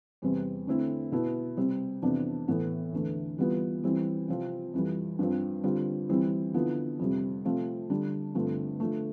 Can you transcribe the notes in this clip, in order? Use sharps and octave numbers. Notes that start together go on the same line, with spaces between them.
E2 C3 G3 C4
D3 A3 C4 E4
B2 B3 E4
C3 G3 C4
F2 C3 E3 B3 D4
A2 E3 B3
E2 D3 A3
E3 G3 B3 F4
E3 G3 C4 E4
C3 F3 C4 F4
F2 E3 G3
G2 F3 C4
D3 G3 C4 F4
E3 G3 C4 E4
D3 F3 B3 E4
F2 C3 G3
C3 F3 A3 C4 F4
D3 G3 D4
G2 D3 F3 A3 C4
D3 F3 A3